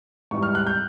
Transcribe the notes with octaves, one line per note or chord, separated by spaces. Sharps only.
G#2 E3 G3 C#6
F6
F#6
G6